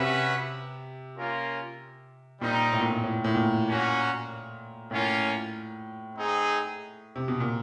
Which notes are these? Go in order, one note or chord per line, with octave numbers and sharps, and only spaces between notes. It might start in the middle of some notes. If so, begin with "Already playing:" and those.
Already playing: C3 C#4 F#4 B4 E5
A#3 C#4 F4 A#4
A#2 G3 C4 D#4
A2
A#2
A2
A2
A2
A#2
A#3 C#4 F#4
A2 A#3 C#4 F4
C4 D#4 G#4
C3
B2
A#2